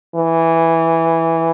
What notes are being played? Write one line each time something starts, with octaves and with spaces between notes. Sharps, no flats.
E3